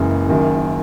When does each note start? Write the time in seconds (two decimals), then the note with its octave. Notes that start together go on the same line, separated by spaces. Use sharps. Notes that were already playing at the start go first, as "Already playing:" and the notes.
Already playing: F#1 F#2 E3 G#3
0.29 F#1 F#2 D#3